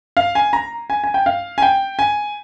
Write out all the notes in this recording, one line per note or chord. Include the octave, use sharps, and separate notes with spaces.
F5
G#5
A#5
G#5
G#5
G5
F5
G#5
G5
G#5